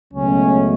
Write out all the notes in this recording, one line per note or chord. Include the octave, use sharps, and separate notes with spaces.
C#2 B2 F#3 A3 C#4